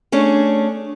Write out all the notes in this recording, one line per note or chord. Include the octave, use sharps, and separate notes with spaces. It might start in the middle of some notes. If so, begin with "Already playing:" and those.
A3 C#4 D4 G#4